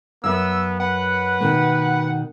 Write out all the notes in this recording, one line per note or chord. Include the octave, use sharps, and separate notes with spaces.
F#2 B3 E5 E6
B4 F#5
B2 D#3 A#3